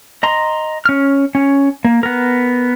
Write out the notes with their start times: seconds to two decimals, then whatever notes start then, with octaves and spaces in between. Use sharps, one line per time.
0.23 D#5 A#5 C6
0.85 C#4 F6
1.35 C#4
1.85 A#3
2.03 B3 A#4